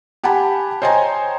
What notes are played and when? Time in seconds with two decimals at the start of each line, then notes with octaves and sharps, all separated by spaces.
0.24 G4 F#5 G#5 A5 B5
0.82 C5 C#5 D#5 G5 G#5 A#5